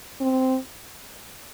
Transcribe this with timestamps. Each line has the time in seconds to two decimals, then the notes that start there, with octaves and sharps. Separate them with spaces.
0.21 C4